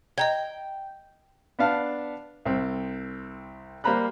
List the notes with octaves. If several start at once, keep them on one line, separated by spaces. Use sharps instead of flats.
D#5 G5 A#5 G#6
B3 D4 F5 A5
C2 C4
G3 A#3 C5 A#5 B5 F#6